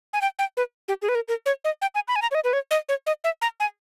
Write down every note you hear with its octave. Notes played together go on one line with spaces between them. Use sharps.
G#5
G5
G5
B4
G4
G#4
B4
A#4
A#4
C#5
D#5
G5
G#5
B5
G#5
A#5
C#5
D#5
B4
C#5
D#5
C#5
D#5
E5
A#5
G#5